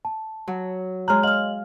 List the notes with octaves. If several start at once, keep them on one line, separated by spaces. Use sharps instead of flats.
A5
F#3
G#3 C#5 A#5 F6 F#6
C#5 D#5 F5 F6 F#7